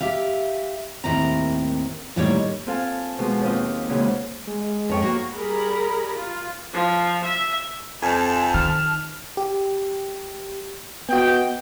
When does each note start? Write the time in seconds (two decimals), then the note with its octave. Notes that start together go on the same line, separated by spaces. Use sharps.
0.01 G4 E5 F5
1.04 D#2 A2 C4 E4 A#4 A#5
2.16 D#2 A2 G3 A#3 D#4 C#5
2.67 C4 F4 A4 F5 G#5 A5
3.18 B2 F3 G#3
3.41 D#2 C4 F4 D#5
3.89 A#2 C#3 E3 F#3 G#3
4.47 G#3
4.89 F2 C#5 G5
5.02 A#3 F#4
5.33 G3 G#4 A#4 A#5 B5
6.16 F4
6.73 F3
7.25 E5
8.02 F2 G#5 A5
8.54 D#3 F6
9.37 G4
11.09 B3 F#4 D#5 G5